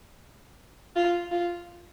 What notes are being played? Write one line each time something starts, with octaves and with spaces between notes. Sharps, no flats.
F4
F4